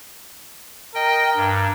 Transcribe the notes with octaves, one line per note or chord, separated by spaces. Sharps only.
A#4 D#5 G5
G2